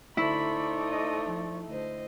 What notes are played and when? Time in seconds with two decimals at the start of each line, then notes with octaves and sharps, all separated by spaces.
0.17 D3 A3 D#4 E4 C5 D5 B5 C#6
0.88 D#5 D#6
1.21 F3
1.71 D2 C5 D#5